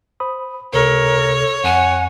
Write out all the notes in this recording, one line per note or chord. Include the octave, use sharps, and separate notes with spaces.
C5 B5 D#6
C#2 C3 A4 A#4 C#5
F2 F#5 G#5